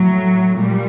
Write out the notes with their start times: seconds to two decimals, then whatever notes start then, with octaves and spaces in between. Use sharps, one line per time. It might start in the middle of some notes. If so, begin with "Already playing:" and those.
Already playing: A2 F#3
0.56 A#2 G3